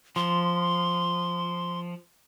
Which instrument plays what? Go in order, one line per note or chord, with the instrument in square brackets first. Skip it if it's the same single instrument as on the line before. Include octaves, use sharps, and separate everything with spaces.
[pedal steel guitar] F3 [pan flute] C6